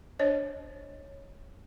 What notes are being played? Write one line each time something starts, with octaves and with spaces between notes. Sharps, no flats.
D4 C5 C#5 D#5